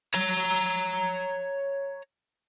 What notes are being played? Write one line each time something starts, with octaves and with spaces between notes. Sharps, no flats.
C#5 A#5